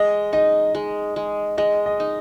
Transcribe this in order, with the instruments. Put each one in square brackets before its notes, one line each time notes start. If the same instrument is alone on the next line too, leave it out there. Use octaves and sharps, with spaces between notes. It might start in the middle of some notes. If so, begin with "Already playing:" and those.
Already playing: [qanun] G#3 [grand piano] D#5
[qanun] D#4 [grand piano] D#5
[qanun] G#3
G#3
[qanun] G#3 [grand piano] D#5
[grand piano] D#5
[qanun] D#4